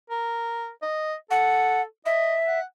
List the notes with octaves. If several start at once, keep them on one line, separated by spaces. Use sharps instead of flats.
A#4
D#5
A4 F#5
D#5 E5
F#5